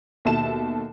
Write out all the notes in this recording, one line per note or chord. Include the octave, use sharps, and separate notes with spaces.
D#2 B2 A4 E5 A5 E7